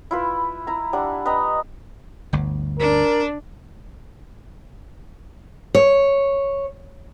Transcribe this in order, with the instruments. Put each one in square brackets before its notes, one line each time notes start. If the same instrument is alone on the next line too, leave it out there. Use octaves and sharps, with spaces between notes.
[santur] E4 F4 B4
E4 A#5
G3 D4 F#5
B4 D#5 G5 A#5
[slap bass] G1 D2
[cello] D4 [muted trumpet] A#4
[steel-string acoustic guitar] C#5